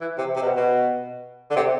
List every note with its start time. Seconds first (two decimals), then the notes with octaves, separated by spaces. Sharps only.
0.01 E3
0.18 C3
0.35 C3
0.42 B2
0.57 B2
1.50 D3
1.56 C3